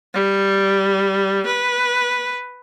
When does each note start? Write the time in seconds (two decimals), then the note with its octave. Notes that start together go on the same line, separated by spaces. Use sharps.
0.14 G3
1.46 B4